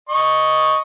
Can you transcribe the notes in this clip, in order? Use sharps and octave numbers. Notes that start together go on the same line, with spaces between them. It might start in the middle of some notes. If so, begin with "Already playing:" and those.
D#5 C#6